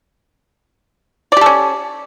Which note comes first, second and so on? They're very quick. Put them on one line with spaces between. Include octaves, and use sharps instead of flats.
D5 G4 A4 C#4